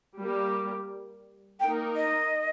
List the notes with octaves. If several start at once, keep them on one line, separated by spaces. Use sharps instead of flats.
G3 A#3 G4
A#3 D#4 A#4 G5
D#5